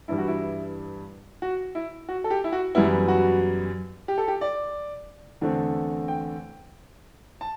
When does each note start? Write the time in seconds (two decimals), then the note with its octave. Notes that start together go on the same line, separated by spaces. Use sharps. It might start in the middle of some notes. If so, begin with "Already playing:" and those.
0.08 G2 E3 G3 E4
0.18 F#4
0.28 E4
1.42 F#4
1.75 E4
2.09 F#4
2.24 A4
2.31 G4
2.44 E4
2.52 F#4
2.75 F#2 E3 G3 B3 E4
3.08 F#4
4.08 G4
4.18 A4
4.28 G4
4.41 D5
5.41 E2 D3 A3 C4
6.08 G5
7.41 A5